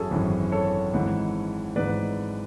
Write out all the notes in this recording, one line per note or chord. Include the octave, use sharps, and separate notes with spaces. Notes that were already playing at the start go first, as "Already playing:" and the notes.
Already playing: G#1 F#2 E3 C#4 E4 F#4 G#4 A4
G#1 F#2 E3
A4 C#5
G#1 G#2 E3
G#1 G#2 E3 B4 D5